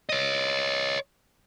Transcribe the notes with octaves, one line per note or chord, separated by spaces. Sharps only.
C#5 D#5